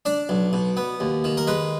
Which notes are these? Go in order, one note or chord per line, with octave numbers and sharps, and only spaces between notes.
D4 D5
B1
B2
B3
D#2
D#3
A#4
G#3 B4